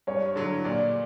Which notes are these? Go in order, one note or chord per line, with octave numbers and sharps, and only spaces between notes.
G2 C#5
D3 F#3
A#2 D5